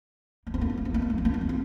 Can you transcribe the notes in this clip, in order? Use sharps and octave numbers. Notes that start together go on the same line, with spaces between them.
A#3
C4
A#3
C4
A#3
C4
A#3
C4
A#3
C4
A#3
C4
A#3
C4